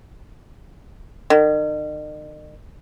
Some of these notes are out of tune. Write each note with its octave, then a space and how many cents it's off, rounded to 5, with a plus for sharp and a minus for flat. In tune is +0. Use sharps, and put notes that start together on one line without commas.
D#3 -40